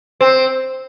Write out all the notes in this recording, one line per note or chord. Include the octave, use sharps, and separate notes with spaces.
C4